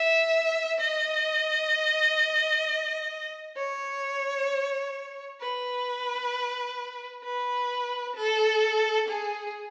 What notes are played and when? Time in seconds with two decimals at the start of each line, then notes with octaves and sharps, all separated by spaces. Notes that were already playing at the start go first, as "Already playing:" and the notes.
Already playing: E5
0.80 D#5
3.57 C#5
5.41 B4
7.24 B4
8.16 A4
9.08 G#4